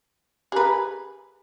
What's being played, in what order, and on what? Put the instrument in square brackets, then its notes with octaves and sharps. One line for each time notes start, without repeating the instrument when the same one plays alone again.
[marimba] G4 A#5 [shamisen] G#4 B4